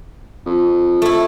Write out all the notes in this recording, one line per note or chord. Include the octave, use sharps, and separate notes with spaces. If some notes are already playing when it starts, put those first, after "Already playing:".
F2
A3 E4